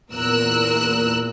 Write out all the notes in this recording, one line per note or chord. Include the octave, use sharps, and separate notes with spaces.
E2 A#2 A#4 E6 F#6